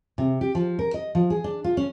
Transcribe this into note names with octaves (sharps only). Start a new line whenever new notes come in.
C3
G4
F3
A#4
D#5
F3
G#4
D4
F4
C#4